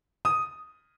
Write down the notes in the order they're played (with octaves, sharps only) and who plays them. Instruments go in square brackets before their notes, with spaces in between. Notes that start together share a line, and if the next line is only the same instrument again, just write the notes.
[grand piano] D#6